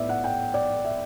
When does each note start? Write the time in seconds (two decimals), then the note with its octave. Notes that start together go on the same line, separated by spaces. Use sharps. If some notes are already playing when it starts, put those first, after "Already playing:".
Already playing: A2 B3 B4 D5 E5
0.09 F#5
0.24 G5
0.54 D5
0.85 E5